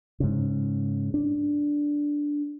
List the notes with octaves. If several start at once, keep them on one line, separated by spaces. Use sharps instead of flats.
G#2 C#3
D4